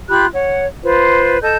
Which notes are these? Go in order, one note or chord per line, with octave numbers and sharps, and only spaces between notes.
F4 G4 B5 F#6
C#5 F#5
F4 B4 C5
A4 D#5 A5 G6